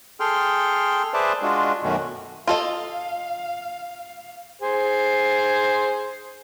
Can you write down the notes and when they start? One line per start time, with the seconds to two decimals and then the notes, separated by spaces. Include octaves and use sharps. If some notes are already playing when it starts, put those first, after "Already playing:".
0.20 G#4 A4 G5 C6 F6
1.14 G#4 B4 C5 D5 E5 A5
1.42 G#3 D4 F4 F#4
1.83 F#2 B2 D#3 A3 C#4 F#4
2.48 F4 A4 D#5 F5
4.62 G#4 C5